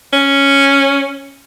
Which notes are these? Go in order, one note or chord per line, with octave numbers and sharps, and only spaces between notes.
C#4